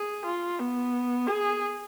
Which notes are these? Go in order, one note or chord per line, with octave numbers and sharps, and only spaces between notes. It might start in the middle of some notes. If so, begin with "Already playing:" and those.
Already playing: G#4
F4
B3
G#4